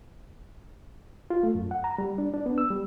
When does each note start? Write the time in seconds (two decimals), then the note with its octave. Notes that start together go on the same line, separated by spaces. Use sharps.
1.30 F4
1.43 A3
1.55 F#2
1.71 F#5
1.84 A#5
1.98 G3
2.18 D4
2.33 D4
2.46 B3
2.58 E6
2.70 G3